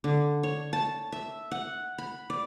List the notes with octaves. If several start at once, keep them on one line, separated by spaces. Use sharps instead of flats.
D3
C#5
A5
E5
F#5
B5
D5